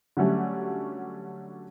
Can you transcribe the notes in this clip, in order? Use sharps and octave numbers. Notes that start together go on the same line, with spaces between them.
D3 F#3 G3 A3 C#4